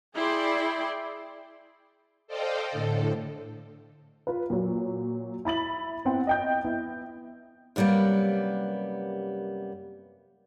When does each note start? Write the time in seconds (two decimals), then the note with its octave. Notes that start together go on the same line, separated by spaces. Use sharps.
0.16 E4 G#4 D5 G5 C6
2.27 A4 C5 D5 D#5 F5 G5
2.70 A2 D3 A4
4.27 F4 B4
4.50 A#2 F#3
5.45 E4 B5 A6 F#7
6.05 B3 C4 E4 F#5 G5
6.27 D#5 G5 G6
6.64 B3 E4
7.76 F#2 C3 G3 A#3 B3